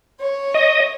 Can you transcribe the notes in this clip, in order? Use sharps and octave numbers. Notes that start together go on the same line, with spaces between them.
C#5
D#5